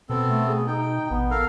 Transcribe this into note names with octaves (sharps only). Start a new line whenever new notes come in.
B2 B3 C4 A4
A3
G#4
D#4 G5
A1 B3
A4 A#4 F5